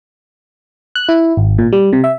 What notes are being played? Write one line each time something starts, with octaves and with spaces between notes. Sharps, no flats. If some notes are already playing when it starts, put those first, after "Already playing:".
F#6
E4
G#1
A#2
G3
C3
E5